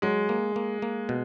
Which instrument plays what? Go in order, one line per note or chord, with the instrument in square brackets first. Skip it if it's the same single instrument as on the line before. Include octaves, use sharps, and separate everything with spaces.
[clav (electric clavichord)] F#3 [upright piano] G#3
[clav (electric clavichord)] A#3
A#3
A#3
B2